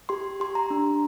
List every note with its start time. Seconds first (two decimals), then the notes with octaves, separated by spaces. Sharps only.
0.09 G4 C6
0.40 G4 C6
0.55 A#5
0.70 D4